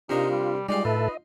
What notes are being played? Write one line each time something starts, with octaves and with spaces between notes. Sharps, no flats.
C3 D4 D#4 F4 A#4
G3
G3 G#3 D#4 F4 D5 F5
A2 A4 B4 E5
D#5